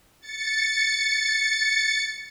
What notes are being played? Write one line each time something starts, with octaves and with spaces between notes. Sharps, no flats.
A6 C#7